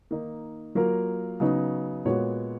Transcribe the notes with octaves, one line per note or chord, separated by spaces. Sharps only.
D#3 A#3 D#4
F#3 A#3 F4 A#4
C#3 F#3 B3 D#4
A#2 G#3 B3 F#4 C#5